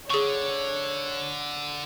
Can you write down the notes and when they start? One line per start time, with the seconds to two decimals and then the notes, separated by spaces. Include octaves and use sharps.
0.10 D3 G#4 C#5 C#6